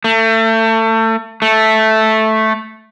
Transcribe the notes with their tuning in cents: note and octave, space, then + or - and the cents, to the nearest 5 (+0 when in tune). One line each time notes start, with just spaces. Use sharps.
A3 +30
A3 -5